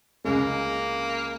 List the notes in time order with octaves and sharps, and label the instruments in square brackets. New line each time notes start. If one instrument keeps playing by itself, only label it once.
[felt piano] C#2 C#3 G#3 [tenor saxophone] A#3